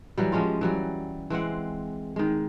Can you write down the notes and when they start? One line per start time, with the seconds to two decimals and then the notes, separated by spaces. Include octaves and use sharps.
0.18 E3 F#3 G3
0.32 F3 G#3 C#4 F4
0.61 E3 F#3 G3
1.30 E3 G#3 C4 F#5
2.16 D#3 G#3